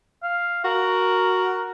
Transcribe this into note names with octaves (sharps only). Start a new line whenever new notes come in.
F5
F#4 A#4